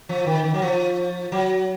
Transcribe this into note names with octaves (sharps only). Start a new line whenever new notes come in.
F3
D#3
D#3
F#3
F3
F#3